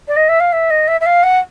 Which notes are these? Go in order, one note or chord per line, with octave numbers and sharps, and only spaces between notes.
D5
D#5
E5
F5
E5
D#5
E5
E5
F5
F#5